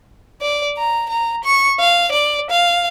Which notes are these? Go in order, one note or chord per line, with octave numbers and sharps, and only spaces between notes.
D5
A#5
A#5
C#6
F5
D5
F5